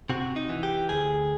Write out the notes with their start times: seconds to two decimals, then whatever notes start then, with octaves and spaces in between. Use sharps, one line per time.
0.10 C3 F#4
0.36 D#4
0.49 E3
0.63 G4
0.89 D2 G#4